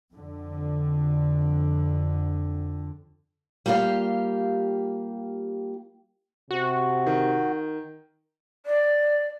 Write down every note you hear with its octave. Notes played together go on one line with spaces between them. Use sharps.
F2 D3
G3 A#3 F4 G4 F5
C3 F#4
D#3
D5